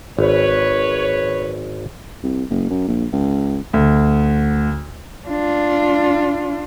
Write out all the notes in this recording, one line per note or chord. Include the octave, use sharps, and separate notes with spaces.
G#1 B4 C#5
C2
F#1
F#2
A#1
C#2
D2
D4 F4